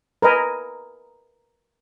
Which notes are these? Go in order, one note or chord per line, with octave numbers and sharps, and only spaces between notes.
A#4 B4 D#5 G#5